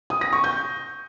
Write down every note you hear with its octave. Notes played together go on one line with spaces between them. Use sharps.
D#6
A#6
C#6
G6